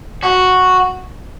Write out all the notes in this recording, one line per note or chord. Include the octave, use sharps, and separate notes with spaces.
F#4